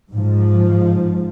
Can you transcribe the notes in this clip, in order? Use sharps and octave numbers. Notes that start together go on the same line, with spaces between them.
G#2 F3